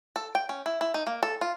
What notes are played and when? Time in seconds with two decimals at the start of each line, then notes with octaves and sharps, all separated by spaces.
0.16 A4
0.35 G5
0.49 C#4
0.66 E4
0.81 E4
0.94 D#4
1.07 A#3
1.23 A4
1.41 F4